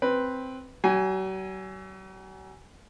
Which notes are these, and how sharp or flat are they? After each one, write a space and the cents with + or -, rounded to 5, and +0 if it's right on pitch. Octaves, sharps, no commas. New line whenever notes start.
C4 +0 B4 +0
F#3 +45 G#5 +0